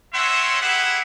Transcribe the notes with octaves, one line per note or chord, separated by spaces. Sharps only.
C4 C#4 C#5 E5 F#5 C6
B3 E4 G4 G#4 E5 F#5